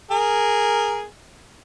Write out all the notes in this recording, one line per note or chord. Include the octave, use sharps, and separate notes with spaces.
G#4 A#4